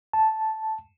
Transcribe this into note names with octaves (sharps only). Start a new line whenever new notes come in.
A5